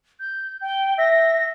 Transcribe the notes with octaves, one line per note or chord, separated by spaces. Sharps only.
G6
G5
E5 A#6